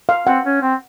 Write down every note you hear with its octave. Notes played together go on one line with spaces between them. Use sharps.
F5
C4 F#5
C#4
C4